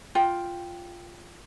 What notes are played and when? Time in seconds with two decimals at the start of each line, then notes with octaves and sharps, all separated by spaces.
0.15 F4 G5